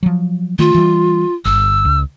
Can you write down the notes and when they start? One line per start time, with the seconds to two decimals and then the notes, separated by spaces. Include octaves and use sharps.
0.03 F3 F#3
0.59 D#3 A3 F4
0.75 E3 G3
1.45 G1 E6
1.85 C#2